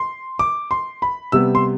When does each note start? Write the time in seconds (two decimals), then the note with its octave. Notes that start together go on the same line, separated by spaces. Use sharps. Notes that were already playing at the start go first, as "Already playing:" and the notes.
Already playing: C6
0.39 D6
0.71 C6
1.02 B5
1.32 C3 G3 B3 E6
1.55 C6